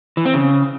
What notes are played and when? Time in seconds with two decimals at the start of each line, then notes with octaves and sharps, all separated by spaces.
0.17 E3
0.26 C4
0.34 C#3